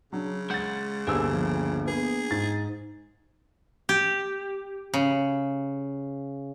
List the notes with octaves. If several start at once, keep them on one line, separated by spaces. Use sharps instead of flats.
C#3 F#3 D4
G#3 F#5 G6 A6
G1 D2 D3 A#3 D4 G4 G#5 E6
F3
B3 G#4
G#2 A6
G4
C#3